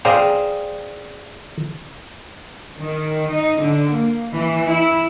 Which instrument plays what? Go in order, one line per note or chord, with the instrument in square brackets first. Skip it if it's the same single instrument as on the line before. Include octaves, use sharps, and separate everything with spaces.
[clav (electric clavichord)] G#4 C5 D5 F5 G5 A#5
[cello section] D#3
D#4
D3
A#3
E3
E4